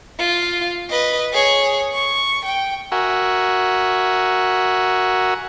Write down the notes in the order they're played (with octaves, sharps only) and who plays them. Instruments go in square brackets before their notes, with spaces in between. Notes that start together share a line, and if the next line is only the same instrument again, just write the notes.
[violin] F4
B4 D#5
G#4 C#5
C#6
G5
[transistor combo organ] F#4 A#4 E5 F#5 G#5